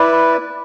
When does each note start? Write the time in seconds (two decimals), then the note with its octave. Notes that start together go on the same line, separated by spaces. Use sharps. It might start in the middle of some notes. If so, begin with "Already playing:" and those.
Already playing: E4 B4 D5